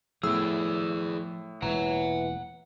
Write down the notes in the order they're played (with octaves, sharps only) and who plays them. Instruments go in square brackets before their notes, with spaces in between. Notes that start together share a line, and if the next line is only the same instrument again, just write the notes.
[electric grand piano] A2 E6 [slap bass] F3 B3 [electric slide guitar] E4 G#4
[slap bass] E1 A#2 G#3 [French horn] E3 [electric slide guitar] F#5 A#5